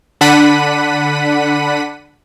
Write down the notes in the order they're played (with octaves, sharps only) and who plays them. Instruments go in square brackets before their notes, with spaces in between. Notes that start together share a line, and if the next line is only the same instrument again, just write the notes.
[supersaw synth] D3 D4 F#5 B5 B6 D#7